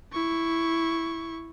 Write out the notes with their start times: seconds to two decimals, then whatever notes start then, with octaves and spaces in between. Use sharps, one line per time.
0.12 E4 C#6